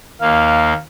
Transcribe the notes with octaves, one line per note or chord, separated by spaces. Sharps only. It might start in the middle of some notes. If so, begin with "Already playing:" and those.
D#2 A#3 F5